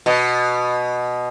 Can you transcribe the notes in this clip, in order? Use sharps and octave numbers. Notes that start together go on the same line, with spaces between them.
B2